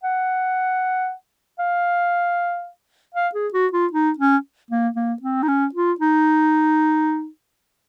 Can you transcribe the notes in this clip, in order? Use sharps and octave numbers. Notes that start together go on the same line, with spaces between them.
F#5
F5
F5
G#4
F#4
F4
D#4
C#4
A#3
A#3
C4
D#4
C#4
F4
D#4